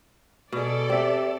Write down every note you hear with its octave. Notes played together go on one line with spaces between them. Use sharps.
B2 G#4 A4 D5
C4 G4 E5